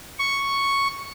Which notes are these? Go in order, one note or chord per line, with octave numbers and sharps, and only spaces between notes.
C#6